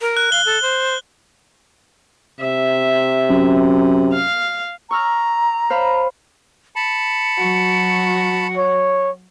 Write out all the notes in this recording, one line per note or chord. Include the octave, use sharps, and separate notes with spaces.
A#4
F#6
F5 G7
A4
C5
C3 E5
F#2
F5
A#5 C#6 E6 F6
C5 F5 B5
A5 B5 C#7
F#3 F#4
C#5